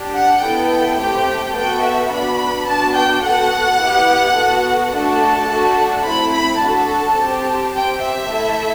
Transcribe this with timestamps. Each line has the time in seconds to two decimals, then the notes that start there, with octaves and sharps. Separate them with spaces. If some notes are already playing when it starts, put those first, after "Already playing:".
Already playing: D4 G4
0.14 F#5
0.42 B3 E4 A4 G5
0.98 A3 C4 G4
1.54 B3 F#4 A4 G5
1.82 E5
2.10 B3 D4 F#4 B5
2.67 B3 D4 F#4 A5
2.95 G5
3.23 B3 F#4 A4 F#5
3.79 B3 E4 G4
4.36 B3 F#4 A4
4.92 A3 D4 F#4 A4 A5
5.48 A3 D4 F#4 A4
6.04 A3 C4 E4 B5
6.32 B5
6.60 D4 F#4 A4 A5
7.17 C4 G4
7.72 C4 G4 G5
8.00 E5
8.29 A3 E4 A4